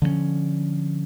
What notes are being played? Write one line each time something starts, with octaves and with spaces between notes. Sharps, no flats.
D3 F3 A#3 C#4